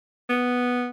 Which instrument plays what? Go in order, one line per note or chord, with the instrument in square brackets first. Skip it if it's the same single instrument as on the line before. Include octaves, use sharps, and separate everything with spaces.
[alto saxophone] B3